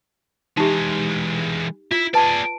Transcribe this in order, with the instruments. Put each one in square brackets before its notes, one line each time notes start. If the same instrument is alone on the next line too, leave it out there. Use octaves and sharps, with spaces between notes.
[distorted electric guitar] E3 G#3 [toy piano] D#4 G4
[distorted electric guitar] E4 [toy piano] F4
[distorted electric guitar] G#4 D5 [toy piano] B4 A5